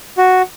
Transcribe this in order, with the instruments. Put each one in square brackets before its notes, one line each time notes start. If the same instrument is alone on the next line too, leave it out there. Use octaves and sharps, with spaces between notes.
[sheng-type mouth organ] F#4